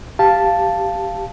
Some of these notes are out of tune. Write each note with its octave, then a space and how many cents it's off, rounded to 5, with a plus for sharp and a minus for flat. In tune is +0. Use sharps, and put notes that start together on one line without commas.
G4 +0 F5 -5 A5 +0